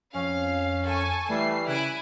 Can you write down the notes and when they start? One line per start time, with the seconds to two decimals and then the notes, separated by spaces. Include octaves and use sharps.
0.14 F2 C#4 F5
0.85 A4 G#5 C#6
1.29 E3 G3 A3 C7
1.67 C#3 E4 G#5 F#6 D7